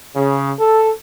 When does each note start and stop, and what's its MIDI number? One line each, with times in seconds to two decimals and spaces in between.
0.15 0.50 49
0.58 0.90 69